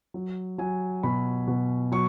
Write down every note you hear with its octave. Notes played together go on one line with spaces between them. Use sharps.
F#3
F#3 G#5
B2 B5
B2
F#3 C#6